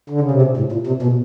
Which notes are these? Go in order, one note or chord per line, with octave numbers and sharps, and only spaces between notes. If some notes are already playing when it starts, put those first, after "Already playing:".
D3
C#3
C3
B2
A2
A#2
C3
B2